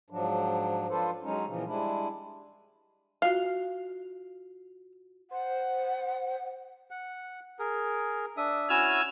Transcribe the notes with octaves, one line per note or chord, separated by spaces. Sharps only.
G#2 F3 F#3 D4
F3 D4 F4 A4 B4 C5
F#3 G#3 C#4 D#4
A#2 C#3 E3 F3
G3 G#3 D4 E4
F4 F#4 F5
C5 F#5
F#5
G#4 A#4
D4 E5 D#6
C#4 E4 F#4 G#5 E6 F6